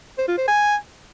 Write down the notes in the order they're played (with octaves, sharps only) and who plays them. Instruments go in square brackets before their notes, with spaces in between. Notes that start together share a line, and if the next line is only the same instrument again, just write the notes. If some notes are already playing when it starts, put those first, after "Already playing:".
[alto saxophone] C5
F4
C5
G#5